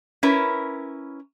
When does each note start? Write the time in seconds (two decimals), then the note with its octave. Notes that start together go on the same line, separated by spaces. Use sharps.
0.23 C#4 E4 A#4 B4